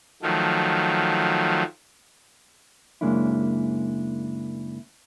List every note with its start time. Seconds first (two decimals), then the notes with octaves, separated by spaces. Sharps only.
0.22 D#3 F3 F#3 A3
3.01 F#2 C#3 G#3 A#3 D4 E4